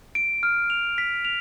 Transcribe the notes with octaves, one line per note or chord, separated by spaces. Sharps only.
D7
F6
F7
B6
F7